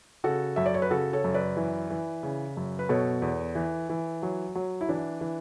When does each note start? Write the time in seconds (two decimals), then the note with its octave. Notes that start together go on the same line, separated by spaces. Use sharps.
0.24 C#3 F#4 A4
0.56 F#2 E5
0.66 D5
0.74 C#5
0.82 B4
0.90 C#3 F#4 A4
1.13 A4 C#5
1.24 F#2
1.34 B4 D5
1.57 E3
1.90 E3
2.23 C#3
2.57 F#2
2.79 B4
2.89 B2 A4 C#5
3.22 E2
3.55 E3
3.90 E3
4.23 F#3
4.55 F#3
4.81 E4
4.89 E3 D4
5.21 E3